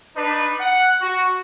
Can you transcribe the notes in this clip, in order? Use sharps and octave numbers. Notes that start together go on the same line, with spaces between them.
D4 D#4 B4
F#5
F#4